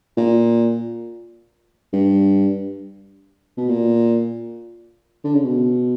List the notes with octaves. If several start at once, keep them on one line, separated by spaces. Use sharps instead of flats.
A#2
G2
B2
A#2
D3
C#3
B2